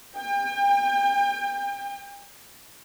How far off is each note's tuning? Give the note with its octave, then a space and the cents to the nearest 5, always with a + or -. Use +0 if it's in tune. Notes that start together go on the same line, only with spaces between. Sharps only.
G5 +40